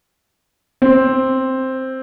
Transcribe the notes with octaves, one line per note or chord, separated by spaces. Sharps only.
C4